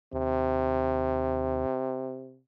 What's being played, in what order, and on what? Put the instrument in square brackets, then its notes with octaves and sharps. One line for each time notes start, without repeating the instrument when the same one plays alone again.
[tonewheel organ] D#2 [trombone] C3